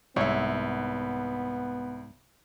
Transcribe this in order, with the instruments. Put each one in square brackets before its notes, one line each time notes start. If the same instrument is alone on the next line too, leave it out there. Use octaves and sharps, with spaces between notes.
[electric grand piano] C2 [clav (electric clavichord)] G#2 [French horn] B3 [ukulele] C#5 E5